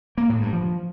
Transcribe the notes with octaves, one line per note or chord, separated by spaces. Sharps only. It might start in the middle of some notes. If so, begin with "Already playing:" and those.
A#3
A2
G2
F3